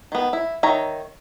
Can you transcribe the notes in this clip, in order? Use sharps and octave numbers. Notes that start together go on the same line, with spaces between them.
D#3 B3
E4
D#3 C#5 E5 A#5